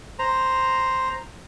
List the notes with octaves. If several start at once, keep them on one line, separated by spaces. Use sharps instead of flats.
C5 A#5